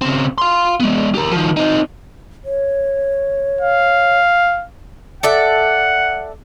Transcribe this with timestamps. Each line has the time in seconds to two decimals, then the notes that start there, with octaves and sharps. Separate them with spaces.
0.02 C#3 C4
0.38 F5 C6
0.80 G#3 B3
1.15 G4 A#4
1.31 D#3 F3
1.57 C4 D#4
2.45 C#5
3.61 F5
5.23 A4 D5 E5 F#5